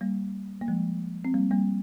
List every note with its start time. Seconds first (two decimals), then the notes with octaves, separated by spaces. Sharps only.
0.01 G3 A#3
0.62 A#3
0.68 F3 G#3
1.25 C4
1.34 G3 A#3
1.51 G3 A#3